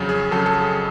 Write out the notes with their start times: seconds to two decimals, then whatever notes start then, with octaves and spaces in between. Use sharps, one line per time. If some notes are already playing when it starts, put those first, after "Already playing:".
Already playing: F2 C#3 F#3
0.09 G#4
0.31 F2 C#3 F#3 A4
0.46 A4
0.61 G#4